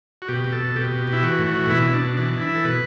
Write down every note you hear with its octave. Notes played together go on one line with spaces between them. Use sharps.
F#4
B2 G4
B2
A4
B2
B2 G4
B2
B2
E4
E3 F#4
A2
F#4
E3
B2 E4
B2 E4
D4
B2
E3 D4
E3
E4
E3
A4
B2 B4